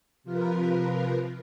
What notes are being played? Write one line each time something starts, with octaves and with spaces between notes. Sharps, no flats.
C3 F3 F4 A#4 B4